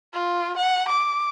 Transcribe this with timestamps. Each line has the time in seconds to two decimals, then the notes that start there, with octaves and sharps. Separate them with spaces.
0.13 F4
0.57 F#5
0.89 D6